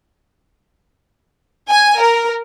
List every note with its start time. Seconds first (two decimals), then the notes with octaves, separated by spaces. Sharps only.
1.70 G#5
2.01 A#4